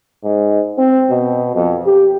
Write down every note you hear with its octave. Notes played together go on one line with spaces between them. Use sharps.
G#2
C4
B2
F2
G4